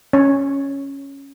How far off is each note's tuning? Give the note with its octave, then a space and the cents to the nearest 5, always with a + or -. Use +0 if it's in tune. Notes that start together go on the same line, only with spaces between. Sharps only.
C#4 +0 C#5 +0